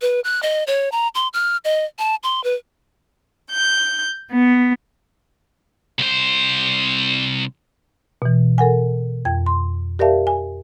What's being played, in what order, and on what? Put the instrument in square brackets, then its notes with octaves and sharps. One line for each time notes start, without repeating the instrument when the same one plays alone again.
[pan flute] B4
F#6
D#5
C#5
A#5
C6
F6
D#5
A5
C6
B4
[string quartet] G6
B3
[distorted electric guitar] C2 C5
[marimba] B2 E3
A4 A#4 F#5 G#5
F2 G5 G#6
C6
G4 A#4 D5 E5 F5 A5
G#5